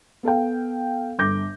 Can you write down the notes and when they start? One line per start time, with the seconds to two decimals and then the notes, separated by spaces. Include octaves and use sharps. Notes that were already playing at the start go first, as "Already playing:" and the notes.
0.23 B3 A4 F5 G5
1.18 G1 D6 G6 A#6